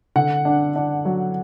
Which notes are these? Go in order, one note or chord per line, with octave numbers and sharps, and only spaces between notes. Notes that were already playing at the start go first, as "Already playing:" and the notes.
D3 F#5
D4
D4
F#3